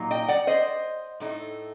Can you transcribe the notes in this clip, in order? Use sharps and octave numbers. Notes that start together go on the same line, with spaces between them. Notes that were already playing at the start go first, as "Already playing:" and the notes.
Already playing: A#2 F#3 A#3 D#4
D#5 G5
D5 F#5
C5 D#5
A2 A3 D#4